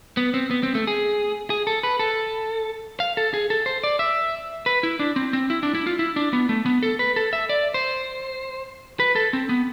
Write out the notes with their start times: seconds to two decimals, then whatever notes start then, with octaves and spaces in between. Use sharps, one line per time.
0.17 B3
0.34 C4
0.51 B3
0.63 C4
0.75 A3
0.87 G#4
1.50 G#4
1.67 A4
1.83 B4
1.99 A4
3.00 F5
3.17 A4
3.34 G#4
3.50 A4
3.66 C5
3.84 D5
3.99 E5
4.66 B4
4.83 E4
4.99 D4
5.16 C4
5.33 C4
5.50 E4
5.63 D4
5.75 E4
5.87 F4
5.99 E4
6.16 D4
6.33 B3
6.49 A3
6.66 B3
6.83 A4
6.99 B4
7.16 A4
7.33 E5
7.49 D5
7.74 C5
9.00 B4
9.16 A4
9.33 C4
9.49 B3